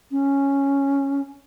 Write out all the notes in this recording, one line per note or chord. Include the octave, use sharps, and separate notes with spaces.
C#4